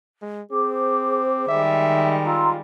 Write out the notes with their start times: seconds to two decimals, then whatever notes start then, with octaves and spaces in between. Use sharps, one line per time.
0.22 G#3
0.51 C4 G#4 C5 D6
1.48 D#3 G3 G#3 E5
2.26 F4 A#5 C6 E6